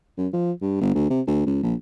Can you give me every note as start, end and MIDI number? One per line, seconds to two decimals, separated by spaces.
0.18 0.28 42
0.33 0.52 53
0.62 0.80 43
0.81 0.94 31
0.95 1.08 38
1.10 1.21 48
1.27 1.45 38
1.46 1.62 37
1.63 1.74 34